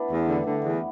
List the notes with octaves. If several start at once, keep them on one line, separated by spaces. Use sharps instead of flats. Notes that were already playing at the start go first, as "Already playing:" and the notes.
Already playing: B3 D4 E4 B4
E2 A3
D3 G3
D3 A3
E2
B3